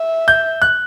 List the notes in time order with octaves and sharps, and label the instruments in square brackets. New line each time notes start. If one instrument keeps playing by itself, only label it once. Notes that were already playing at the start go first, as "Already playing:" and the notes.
Already playing: [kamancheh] E5
[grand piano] G6
F#6